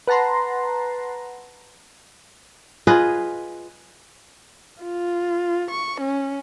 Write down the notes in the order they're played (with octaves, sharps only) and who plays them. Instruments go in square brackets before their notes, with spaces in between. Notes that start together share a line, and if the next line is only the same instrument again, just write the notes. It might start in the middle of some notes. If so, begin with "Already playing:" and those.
[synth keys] B4 F#5 A5 A#5 C6
[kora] F4 G#4 B4 D#5
[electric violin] F4
C#6
C#4